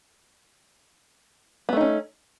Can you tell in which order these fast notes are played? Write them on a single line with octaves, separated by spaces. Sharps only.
B3 A3 D#4 C#4